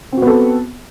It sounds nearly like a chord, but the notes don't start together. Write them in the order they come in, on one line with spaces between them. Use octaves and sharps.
C4 F#4 B3 A4